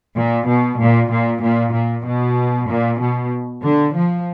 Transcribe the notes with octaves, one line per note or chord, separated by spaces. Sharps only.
A#2
B2
A#2
A#2
A#2
A#2
B2
A#2
B2
D3
F3